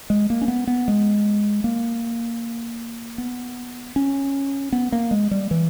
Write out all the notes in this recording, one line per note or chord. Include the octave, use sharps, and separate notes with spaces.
G#3
A#3
C#4
B3
B3
G#3
A#3
B3
C#4
B3
A#3
G#3
G3
E3